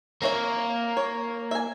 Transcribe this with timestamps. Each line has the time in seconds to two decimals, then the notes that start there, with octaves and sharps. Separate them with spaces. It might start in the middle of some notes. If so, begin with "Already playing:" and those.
0.22 A#3 C4 C#5 E5
0.97 C#5
1.51 E5 G#5